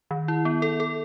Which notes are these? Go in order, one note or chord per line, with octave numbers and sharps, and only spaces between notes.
D#3
E4
B3
A4
A4